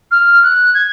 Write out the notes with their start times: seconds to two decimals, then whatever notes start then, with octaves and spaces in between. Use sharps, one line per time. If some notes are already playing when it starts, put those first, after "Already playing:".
0.11 F6
0.43 F#6
0.74 G#6